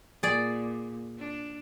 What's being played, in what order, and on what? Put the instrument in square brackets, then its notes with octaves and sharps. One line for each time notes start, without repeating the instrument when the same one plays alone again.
[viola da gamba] A#2 [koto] G#4 D5
[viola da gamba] D4